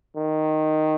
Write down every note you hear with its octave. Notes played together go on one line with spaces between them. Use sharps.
D#3